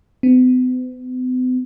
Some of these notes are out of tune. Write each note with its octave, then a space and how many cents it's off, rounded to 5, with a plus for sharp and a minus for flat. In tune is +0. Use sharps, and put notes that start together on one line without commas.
B3 +45